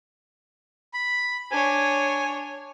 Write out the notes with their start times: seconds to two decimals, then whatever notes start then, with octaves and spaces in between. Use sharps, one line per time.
0.94 B5
1.51 D4 C#5 G#5